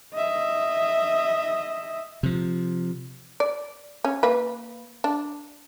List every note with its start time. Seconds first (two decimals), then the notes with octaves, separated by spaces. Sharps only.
0.13 D#5 E5
2.23 C3 F3
3.40 D5
4.05 C#4
4.23 A#3 B4
5.04 D4